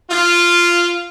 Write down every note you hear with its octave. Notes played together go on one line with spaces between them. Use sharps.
F4